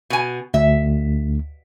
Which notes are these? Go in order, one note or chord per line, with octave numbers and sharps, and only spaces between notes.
B2 G#5
D2 E5